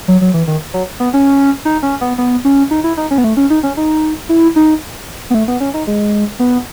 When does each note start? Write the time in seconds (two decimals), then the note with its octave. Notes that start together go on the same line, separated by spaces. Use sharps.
0.08 F#3
0.21 F#3
0.34 E3
0.47 D#3
0.74 F#3
1.00 B3
1.14 C#4
1.65 D#4
1.83 C#4
2.01 B3
2.18 B3
2.45 C#4
2.71 D#4
2.84 E4
2.97 D#4
3.11 C#4
3.18 B3
3.24 A3
3.37 C#4
3.50 D#4
3.63 C#4
3.77 D#4
4.29 E4
4.56 D#4
5.30 B3
5.34 A3
5.48 B3
5.60 C#4
5.74 D#4
5.87 G#3
6.39 B3